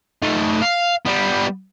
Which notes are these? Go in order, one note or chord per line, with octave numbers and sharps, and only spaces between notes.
A3 D#4
F5
G3 B3